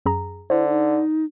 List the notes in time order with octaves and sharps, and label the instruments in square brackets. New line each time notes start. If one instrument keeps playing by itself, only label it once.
[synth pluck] F#2 G#4 A#5
[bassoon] D3 [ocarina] E4 [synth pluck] C5
[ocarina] D#4